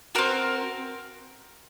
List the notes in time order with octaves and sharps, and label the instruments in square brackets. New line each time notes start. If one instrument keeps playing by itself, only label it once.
[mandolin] C4 F#4 A#4